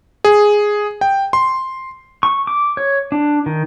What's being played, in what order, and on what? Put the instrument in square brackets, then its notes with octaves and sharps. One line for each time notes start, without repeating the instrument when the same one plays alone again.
[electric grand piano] G#4
G5
C6
[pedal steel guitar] C#6
D6
C#5
D4
D#3